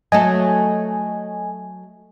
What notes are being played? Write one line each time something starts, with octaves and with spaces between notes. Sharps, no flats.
F#3 A3 A4 D#5 G#5